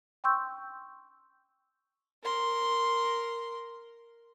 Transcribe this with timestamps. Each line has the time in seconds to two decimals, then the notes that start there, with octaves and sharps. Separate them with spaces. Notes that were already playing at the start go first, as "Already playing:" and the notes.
0.24 G5 C6 C#6 E6 G6
2.23 A#4 C6